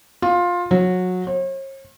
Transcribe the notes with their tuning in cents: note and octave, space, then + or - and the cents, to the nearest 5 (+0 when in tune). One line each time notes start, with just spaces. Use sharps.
F4 +15
F#3 -20
C#5 -45